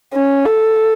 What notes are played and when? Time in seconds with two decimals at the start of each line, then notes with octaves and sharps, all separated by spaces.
0.14 C#4
0.46 A4